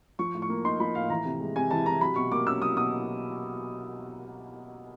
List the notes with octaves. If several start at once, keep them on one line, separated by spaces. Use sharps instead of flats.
F3 C#6
A2
C#6
A#3
D#4 C6
F3 B5
A2 F5
E3 A#5
C3
G#3
C3 G#5
E3 A5
C3 A#5
F#3 B5
B2 C#6
A#3 D6
C#4 E6
F#3 D#6
B2 D#6